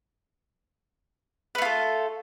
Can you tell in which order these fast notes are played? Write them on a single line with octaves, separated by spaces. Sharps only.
B4 A3 F4 A4